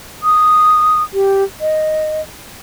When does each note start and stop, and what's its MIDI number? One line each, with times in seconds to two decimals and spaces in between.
0.23 1.03 87
1.13 1.44 67
1.61 2.21 75